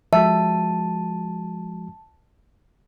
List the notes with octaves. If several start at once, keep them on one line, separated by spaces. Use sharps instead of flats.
F3 G#3 F#4 E5 A5